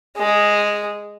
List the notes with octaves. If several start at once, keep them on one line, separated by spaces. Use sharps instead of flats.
G#3